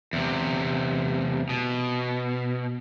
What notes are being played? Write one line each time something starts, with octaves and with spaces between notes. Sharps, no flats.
E2 C3
B2